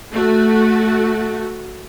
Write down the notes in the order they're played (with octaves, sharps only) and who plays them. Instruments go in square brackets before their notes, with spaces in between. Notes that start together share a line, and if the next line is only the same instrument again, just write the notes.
[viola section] A3 F#4